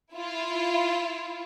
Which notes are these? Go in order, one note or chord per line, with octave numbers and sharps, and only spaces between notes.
E4 F4